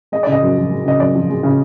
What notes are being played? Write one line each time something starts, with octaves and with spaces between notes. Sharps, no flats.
G#3 D#5
C#3 D5
D#5
F#2
F3
G#3
C#3 D#5
F#2 D5
F3
G#3
C#3